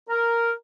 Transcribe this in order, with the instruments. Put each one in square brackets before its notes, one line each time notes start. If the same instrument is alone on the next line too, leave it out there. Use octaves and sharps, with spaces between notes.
[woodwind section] A#4